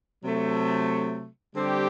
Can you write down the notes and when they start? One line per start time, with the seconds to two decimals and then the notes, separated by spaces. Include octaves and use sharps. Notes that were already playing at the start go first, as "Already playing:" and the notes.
0.23 C3 F#3 A3
1.55 D3 G3 C4 G4